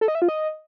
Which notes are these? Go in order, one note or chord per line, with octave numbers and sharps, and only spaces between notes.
A4
D#5
E5
F4
D#5